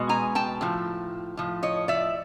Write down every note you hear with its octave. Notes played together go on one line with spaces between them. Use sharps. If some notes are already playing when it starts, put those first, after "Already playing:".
Already playing: B2 G#3
G#5 A#5
G5 A5
A2 F3
A2 F3
C#5 D#5
D5 E5